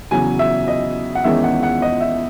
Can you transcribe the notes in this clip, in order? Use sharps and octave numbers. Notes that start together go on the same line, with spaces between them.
E2 C#3 F#3 G#5
E5
D#5
F#5
E2 D#3 G#3 C#4 E5
F#5
F#5
D#5
E5